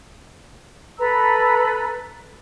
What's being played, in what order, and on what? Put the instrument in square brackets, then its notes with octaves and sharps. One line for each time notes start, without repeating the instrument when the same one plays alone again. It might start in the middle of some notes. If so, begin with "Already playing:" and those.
[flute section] A4 B4 A#5 E6